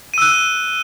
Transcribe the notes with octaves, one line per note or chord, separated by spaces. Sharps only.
E6 F#6 D#7